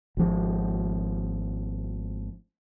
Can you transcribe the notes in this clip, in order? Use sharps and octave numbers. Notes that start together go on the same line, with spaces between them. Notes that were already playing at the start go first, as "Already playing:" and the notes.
G#1 F3